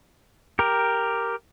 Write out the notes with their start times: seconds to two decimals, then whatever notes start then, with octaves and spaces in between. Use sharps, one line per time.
0.59 G4 A#4